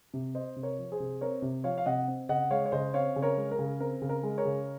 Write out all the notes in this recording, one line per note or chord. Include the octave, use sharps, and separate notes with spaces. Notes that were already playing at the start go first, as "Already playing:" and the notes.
C3
C4 C5 D#5
C3
A#4 C#5
F3
G#4 C5
C3
C4 A#4 C#5
C3
F3 C#5 F5
F5
C3 D#5 F#5
C4
C#3 D#5 F#5
G#3 C#5 F5
C#5
C#3 C5 D#5
C4 C#5 F5
C#3
A#4 C#5
G#3
A#4
C#3
C4 A#4
C#3
A#4
G#3
A#4 C#5
C#3